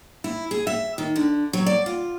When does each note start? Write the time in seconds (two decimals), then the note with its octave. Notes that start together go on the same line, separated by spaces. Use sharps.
0.24 E4
0.51 G#4
0.67 E5
0.98 D#3
1.16 D3
1.53 F#3
1.66 D5
1.86 F4